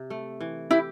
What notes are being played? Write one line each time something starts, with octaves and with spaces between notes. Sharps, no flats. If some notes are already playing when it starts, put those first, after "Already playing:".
Already playing: C3
A3
E3
E4 G4